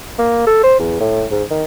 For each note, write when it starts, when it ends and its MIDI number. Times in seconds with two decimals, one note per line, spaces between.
0.18 0.46 58
0.46 0.59 69
0.63 0.75 72
0.79 1.00 40
1.00 1.25 45
1.31 1.43 44
1.50 1.65 51